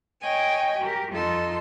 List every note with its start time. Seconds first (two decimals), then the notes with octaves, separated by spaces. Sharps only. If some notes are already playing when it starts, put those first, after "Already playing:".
0.22 C#5 D#5 G5 G#5
0.79 G4 A#4
1.11 F2 D#4 F4 A4 C6